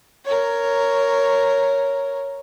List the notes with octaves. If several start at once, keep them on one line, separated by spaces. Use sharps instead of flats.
A#4 C#5